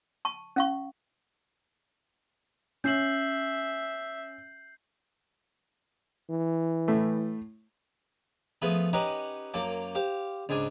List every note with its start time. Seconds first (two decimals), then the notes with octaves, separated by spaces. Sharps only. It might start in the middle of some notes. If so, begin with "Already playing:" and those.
0.25 A5 C#6
0.56 C#4 F5 C#6
2.84 C#4 E5 G6 C7 F#7
6.30 E3
6.88 A2 A3
8.62 F3 A3 B3 G#4 B4
8.93 C#4 D#4 G4 B4 F#5 A#5
9.54 F#2 F#3 A#3 A5 D6
9.95 G4 C5 F5
10.49 C#2 G#2 D4 G#5